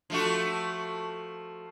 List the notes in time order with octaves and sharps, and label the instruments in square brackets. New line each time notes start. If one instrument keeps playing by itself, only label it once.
[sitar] F3 A3 F#4